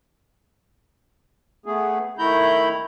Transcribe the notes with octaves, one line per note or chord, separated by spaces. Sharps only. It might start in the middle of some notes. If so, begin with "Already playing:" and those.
A3 B3 G#4
D#3 A3 E4 A#5 B5 G6